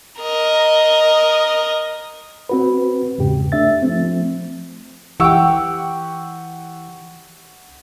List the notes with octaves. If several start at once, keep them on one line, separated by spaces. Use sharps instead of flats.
A#4 D#5
C4 F#4 B4
E2 G#2 C#3 G4
A3 D4 E5 A6
F3 A3 C4
E3 G4 F#5 G5 C#6 E6